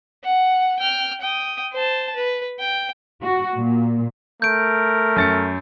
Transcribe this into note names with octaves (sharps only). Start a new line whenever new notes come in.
F#5
G5 F6
G5 D#6
C5 A5
B4
G5
F#4
A#2
A3 A#4 G6 D7
F#2 A6 C#7